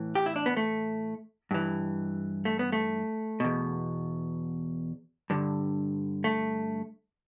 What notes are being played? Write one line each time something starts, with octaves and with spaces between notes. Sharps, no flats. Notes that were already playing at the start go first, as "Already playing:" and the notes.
Already playing: A2 E3
G4
E4
D4
B3
A3
G2 E3
A3
B3
A3
E2 B2
G2 D3
A3